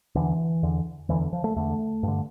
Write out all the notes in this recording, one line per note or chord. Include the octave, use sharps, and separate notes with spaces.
E2 D3 E3
E2 D3
E2 D3 E3
F3
A3
E2 D3 A3
G2 D3